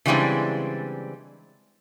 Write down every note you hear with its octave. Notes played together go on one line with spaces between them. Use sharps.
C#3 E3 G3 G#3 C4 D4